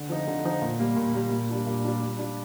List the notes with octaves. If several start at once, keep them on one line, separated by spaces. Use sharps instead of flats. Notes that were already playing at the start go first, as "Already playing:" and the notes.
Already playing: D3
F3 C4 D#4
D3
F3 C4 D#4
A#2
G3 A#3
A#2
G3 A#3
A#2
G3 D4 F4
A#2
G3 D4 F4
G3
D4 F4